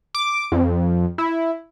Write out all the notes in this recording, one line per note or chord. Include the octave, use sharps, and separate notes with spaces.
D6
F2
E4